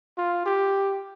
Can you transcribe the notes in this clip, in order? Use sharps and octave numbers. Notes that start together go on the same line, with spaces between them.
F4
G4